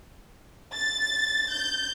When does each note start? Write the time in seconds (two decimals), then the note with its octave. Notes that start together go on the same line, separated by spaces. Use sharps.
0.74 A6
1.52 G6